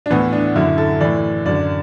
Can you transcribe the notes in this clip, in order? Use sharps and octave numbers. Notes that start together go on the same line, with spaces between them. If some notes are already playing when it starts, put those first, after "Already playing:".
D4
A2 E3 B3
D4
F#2 D3 E4
A4
A2 E3 D5
F#2 D3 D5